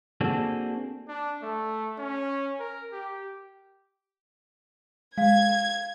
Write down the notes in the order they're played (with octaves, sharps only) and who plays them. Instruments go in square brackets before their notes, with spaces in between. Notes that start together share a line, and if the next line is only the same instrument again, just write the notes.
[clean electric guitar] A#3 C4 D4 F#4 G#4 A4
[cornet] D4
A3
C#4
A#4
G4
[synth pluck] G#3 [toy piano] F5 [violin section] G#6